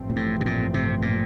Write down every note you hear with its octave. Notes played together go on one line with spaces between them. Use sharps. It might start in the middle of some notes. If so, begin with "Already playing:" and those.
Already playing: A1 G2 F3 A3 C4
A#2
A2
C3
A#2
C3
A#2